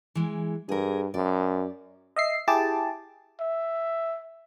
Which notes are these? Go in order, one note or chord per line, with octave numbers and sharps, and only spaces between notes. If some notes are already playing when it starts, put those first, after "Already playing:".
E3 G#3
G2 G#4 A#4
F#2 D5
D#5 E5 C7
E4 G4 G#4 A5 D6
E5